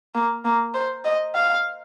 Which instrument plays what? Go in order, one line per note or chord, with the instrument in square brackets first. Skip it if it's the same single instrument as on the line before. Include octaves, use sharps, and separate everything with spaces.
[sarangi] A#3
A#3
C5
D#5
F5